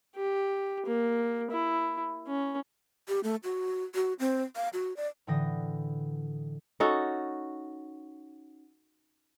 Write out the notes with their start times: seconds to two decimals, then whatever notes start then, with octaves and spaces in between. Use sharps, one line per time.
0.16 G4
0.86 A#3
1.51 E4
2.27 C#4
3.08 G4
3.24 A3
3.44 F#4
3.95 F#4
4.19 C4
4.56 F5
4.73 F#4
4.97 D5
5.27 A2 D3 E3 G5 D#6 A#6
6.80 C#4 D#4 F#4 A4